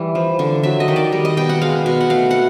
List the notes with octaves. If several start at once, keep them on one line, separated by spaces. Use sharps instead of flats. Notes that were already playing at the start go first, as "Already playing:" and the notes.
Already playing: E3 G3
F3
D3
F#3 E5
D#5
D#3
D5
G3
D#5
B2 G5
F#5
G#3 F5
B2
F#5
A3 F5
F#5